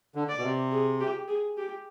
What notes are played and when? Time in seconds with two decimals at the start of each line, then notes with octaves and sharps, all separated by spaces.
0.15 D3
0.29 D5
0.37 B2
0.44 C3
0.72 G#4
1.01 G4
1.28 G#4
1.58 G4